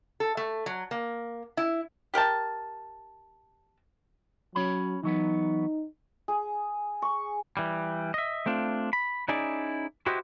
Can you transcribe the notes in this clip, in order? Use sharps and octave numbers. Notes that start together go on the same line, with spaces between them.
A4
A3
F#3
A#3
E4
G4 A#4 G5 A5
F#3 C#4 C#5 B5
E3 F#3 B3 D#4
G#4
C#6
E3 G3
D#5 E5
A3 C4 D4 F4
B5
C#4 D#4 E4 G#4 D5
E4 F#4 G4 B4 C5 D#5